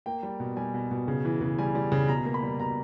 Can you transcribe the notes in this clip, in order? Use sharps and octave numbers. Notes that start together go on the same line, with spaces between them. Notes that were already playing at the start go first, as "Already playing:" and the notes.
A#3 G5
G3
B2
G3 G#5
B2
B2
C#3
E3
C#3
G3 G#5
G3
C#3
B2 A#5
A#3
B5
G3
B2 A#5